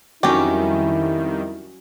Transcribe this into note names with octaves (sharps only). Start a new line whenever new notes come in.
F2 D#3 F#3 G3 C#4 E4 G4